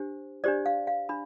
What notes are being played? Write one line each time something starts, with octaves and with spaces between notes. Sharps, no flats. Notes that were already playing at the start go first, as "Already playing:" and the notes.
Already playing: D4 G4 C5
D4 G4 C5 D5
F5
F5
D4 B5